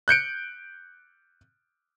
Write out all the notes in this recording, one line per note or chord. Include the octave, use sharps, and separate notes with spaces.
F#6 G6 C#7 D7